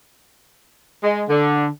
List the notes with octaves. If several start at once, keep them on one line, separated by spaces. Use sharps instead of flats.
G#3
D3